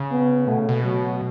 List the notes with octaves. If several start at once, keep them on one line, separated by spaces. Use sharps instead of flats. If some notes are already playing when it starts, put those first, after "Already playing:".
Already playing: C#3
B3
B2 A3
C#3
B2
F#3